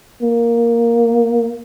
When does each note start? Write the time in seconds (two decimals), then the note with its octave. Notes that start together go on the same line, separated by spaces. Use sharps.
0.22 A#3